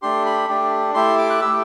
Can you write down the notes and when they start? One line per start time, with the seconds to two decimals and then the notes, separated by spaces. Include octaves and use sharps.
0.02 A3 D4 G4 C6
0.26 B5
0.49 A3 D4 G4
0.94 A3 E4 G4 C6
1.18 D6
1.30 F#6
1.41 A3 E4 G4 E6